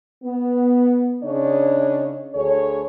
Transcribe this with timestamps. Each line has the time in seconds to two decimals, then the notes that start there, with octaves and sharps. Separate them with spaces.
0.24 B3
1.23 C#3 D4 D#4 C#5
2.34 D2 G#4 A4 C#5